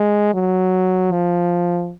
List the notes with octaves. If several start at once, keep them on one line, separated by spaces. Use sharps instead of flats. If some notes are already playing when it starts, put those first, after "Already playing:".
Already playing: G#3
F#3
F3